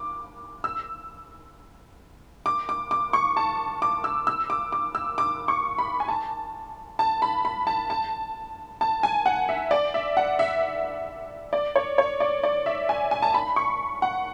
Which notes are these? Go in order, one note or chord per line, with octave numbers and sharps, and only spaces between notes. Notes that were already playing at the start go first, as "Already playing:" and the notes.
Already playing: D6
E6
D6
D6
D6
C#6
A5
D6
E6
E6
D6
D6
E6
D6
C#6
B5
G#5
A5
A5
B5
B5
A5
A5
A5
G#5
F#5
E5
D5
E5
F#5
E5
D5
C#5
C#5
D5
D5
E5
G#5
G#5
A5
B5
C#6
F#5